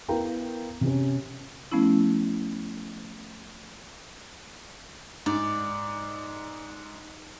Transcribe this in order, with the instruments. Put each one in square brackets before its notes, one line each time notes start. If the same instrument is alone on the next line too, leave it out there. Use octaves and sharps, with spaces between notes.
[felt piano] B3 E4 A#4 F5 G5 A#5
C3 C#4
[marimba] F3 A3 B3 C#4 E4
[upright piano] G#2 [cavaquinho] D5